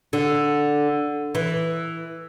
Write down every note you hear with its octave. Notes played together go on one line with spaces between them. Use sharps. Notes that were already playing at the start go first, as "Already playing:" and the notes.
D3
E3